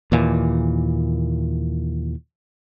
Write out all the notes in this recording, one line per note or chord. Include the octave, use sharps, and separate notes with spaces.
D#2 A#2 E3